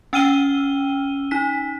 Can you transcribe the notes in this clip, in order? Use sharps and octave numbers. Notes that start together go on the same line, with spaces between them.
C#4 G5 E6 F6 D#7 G7
D#4 B6